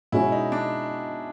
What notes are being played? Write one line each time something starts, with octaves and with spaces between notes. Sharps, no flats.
B2 G#3 C#4 E4 F#4
D#4
D4